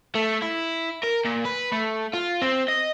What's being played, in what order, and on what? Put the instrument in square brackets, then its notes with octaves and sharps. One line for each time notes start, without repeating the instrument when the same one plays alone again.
[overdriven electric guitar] A3
E4
A#4
A#2
B4
A3
F4
C4
D#5